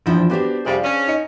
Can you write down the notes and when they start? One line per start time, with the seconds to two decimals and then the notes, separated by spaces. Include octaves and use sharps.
0.06 A#1 E2 F3 E4 G5
0.30 B3 D4 F#4 G4 C5
0.65 F2 C3 G3 G#4 D5 F5
0.84 C#4
1.07 D#4 D#5 C#7